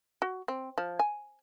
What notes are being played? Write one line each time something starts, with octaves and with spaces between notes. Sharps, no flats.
F#4
C4
F3
G#5